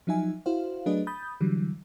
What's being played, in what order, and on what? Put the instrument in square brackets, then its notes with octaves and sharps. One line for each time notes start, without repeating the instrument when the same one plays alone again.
[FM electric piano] F3 F#3 D#4 E5 G#5
E4 F#4 C5 F5
F#3 A3 D4 G#4 B4 D#5
B5 D#6 G6 A6
D3 E3 F#3 G3